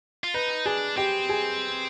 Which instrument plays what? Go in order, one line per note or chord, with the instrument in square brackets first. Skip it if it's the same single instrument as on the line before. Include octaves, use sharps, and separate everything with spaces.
[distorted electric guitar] F4
[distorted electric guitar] D#4 [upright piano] B4
[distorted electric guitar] D4 [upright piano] G#4
[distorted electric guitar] C4 [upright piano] G4
[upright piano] G#4